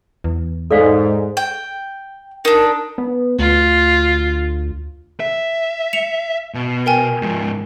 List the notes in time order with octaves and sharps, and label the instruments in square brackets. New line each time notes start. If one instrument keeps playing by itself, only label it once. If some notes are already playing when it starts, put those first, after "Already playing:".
[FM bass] E2
[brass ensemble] G#2 [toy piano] A4 D5 F5
[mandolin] G5
[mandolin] D4 D#4 [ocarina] A#4
[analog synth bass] B3
[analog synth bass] D2 [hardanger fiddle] F4
[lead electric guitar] E5
[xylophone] C#7 E7 F7
[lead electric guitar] B2
[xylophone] A#4 G5 G#5
[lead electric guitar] G#2 F3